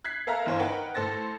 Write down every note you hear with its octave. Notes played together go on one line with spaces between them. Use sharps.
F#6 G#6 B6 C7
A4 A#4 E5 F5 A#5
G1 E3 C5 C#5 F5
D#4 A#4 B4 F#5 G5
A2 A4 C5 A6 A#6